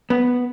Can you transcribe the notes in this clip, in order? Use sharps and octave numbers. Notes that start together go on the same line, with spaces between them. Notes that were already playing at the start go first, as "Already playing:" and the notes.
B3